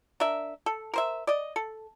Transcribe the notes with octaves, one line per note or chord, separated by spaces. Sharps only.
D4 A#4 E5
A4
A#4 C5 E5
D5 D#5
A4